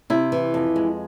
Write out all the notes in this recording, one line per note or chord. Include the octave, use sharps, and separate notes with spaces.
C3 E4
E3
F2
G#3